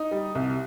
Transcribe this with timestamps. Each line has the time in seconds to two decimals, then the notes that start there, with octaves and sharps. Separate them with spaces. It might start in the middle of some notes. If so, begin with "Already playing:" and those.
Already playing: D#4
0.11 G3
0.35 C2